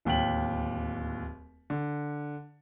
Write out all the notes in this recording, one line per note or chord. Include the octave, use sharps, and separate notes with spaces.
D1 D#2 G5 B6 F#7
D3